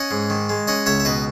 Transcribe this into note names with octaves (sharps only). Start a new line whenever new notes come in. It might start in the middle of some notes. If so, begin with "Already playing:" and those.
Already playing: C#4 D#5 F#5
G#2
D#3
G#3
C#4 D#5 F#5
C#2 C#5 E5
E5
B2 B4 D#5